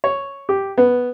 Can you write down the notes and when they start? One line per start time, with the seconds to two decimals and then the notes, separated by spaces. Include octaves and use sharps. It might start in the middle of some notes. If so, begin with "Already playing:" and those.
0.04 C#5
0.49 G4
0.78 B3